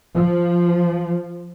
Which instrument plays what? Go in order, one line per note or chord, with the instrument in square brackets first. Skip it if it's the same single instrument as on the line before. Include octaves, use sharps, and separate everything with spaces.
[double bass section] F3